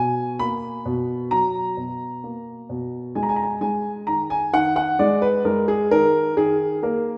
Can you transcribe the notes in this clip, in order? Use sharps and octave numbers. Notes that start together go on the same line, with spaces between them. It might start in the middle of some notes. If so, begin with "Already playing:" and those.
Already playing: B2 G#5
A#3 B5
B2
F#3 A#5
B2
A#3
B2
G#3 G#5
A#5
G#5
A#5
G#5
G#3 G#5
D#3 A#5
G#5
D#3 F#5
F#5
G#3 D5
B4
G#3 A#4
G#4
D#3 A#4
D#3 G#4
A#3 A#4